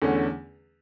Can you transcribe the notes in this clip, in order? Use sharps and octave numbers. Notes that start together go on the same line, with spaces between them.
E2 D3 A3 C#4